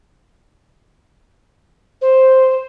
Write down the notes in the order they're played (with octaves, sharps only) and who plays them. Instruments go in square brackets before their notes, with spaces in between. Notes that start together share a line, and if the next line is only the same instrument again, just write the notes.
[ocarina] C5